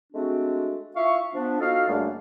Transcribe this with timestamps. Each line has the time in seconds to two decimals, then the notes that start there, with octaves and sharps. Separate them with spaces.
0.13 G#3 A3 C4 D4 F#4
0.96 E4 F4 E5 F5 C#6
1.33 F3 B3 D4
1.60 D#4 F4 F#4 A4 D#5 F5
1.89 F#2 C#3 G3 A3 A#3 D4